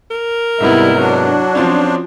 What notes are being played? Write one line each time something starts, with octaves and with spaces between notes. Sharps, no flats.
A#4
G#2 C3 G3 B3 E4
F#3 D4
F3 C4 C#4 F4